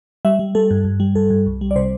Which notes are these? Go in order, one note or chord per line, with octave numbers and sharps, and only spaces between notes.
G3 E5
G3
G3 A4
G2
G2
G3
G2 A4
G2
C2
G3
D5
C3 C5